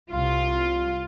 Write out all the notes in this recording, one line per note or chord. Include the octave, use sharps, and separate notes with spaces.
C2 F4